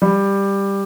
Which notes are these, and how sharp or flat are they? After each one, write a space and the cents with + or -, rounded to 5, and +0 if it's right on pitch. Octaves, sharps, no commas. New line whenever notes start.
G3 +10